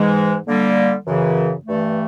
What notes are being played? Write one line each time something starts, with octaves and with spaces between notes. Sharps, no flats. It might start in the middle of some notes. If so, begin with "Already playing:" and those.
Already playing: G#2 E3 G#3
D3 G3 A#3
F#2 C#3 E3
G2 E3 A3